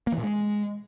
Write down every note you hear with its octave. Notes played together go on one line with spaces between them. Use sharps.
A#3
E3
A#2
G#3